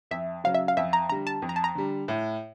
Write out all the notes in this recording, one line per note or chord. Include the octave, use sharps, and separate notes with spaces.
F2 E5
C#3 F#3 F5
E5
F5
F2 E5
A#5
D3 G3 A#5
A5
F2
A#5
A5
A#5
D3 G3
A2